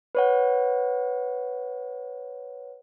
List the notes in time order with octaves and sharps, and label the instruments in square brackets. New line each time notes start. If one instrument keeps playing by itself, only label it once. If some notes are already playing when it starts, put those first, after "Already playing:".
[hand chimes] B4 C#5 F#5